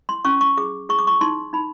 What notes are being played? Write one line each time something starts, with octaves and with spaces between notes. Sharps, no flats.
C6
C#4 C#6
C#6
G#4 D6
G#4 C#6
D6
C#6
D#4 C6
D#4 B5